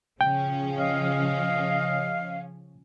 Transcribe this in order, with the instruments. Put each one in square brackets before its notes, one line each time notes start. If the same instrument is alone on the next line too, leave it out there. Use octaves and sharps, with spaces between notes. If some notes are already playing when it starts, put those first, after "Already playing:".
[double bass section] C#3 [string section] F3 C#4 [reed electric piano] G5
[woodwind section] D#5 F5